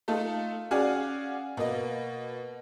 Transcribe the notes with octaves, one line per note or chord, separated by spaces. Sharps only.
A3 D#4 F4 A4
C#4 F#4 G#4 D5 F5
B2 A#3 D#5